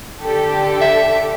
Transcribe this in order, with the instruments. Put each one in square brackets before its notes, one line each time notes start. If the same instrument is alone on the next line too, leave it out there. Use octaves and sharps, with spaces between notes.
[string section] D3 G4 A4
[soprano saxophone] E5